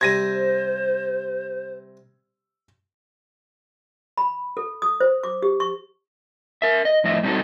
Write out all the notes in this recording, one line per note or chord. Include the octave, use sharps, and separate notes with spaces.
C3 G3 C5 G#6 A#6 D#7
B5
A4
D#6
C5
D6
G4
C#6
A#4 E5
D#5
F2 A2 D#5 E5
G3 C4 D4 D#4 F#4 A4